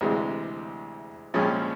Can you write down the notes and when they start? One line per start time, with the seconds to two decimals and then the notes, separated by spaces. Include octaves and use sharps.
0.01 D2 C3 E3 G#3
1.34 C2 A#2 F3 G#3 C#4